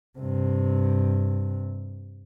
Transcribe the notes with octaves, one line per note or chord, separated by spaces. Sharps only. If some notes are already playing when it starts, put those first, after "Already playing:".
G2 C3